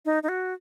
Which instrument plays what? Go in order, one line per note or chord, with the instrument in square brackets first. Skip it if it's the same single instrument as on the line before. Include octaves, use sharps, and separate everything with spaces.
[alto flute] D#4
D#4
F#4